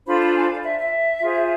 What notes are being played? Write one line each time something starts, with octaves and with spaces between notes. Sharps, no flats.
D4 F4 A4 C5 B5
B5
G#5
F5
D5
E5
E5
F4 G#4 C5